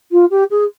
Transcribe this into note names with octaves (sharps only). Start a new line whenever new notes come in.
F4
G4
G#4